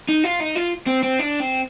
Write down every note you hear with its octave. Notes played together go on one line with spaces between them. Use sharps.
D#4
F4
D#4
F4
C4
C4
D4
C4